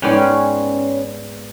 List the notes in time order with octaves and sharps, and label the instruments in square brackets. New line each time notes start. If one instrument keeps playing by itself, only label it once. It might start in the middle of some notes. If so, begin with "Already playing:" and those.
[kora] G#2 G5 [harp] B3 C5 D5 [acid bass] C#4